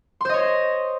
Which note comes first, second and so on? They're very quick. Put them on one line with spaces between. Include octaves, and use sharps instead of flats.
C6 C5 D#5 C#5